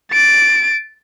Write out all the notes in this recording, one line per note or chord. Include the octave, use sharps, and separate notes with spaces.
A6 D7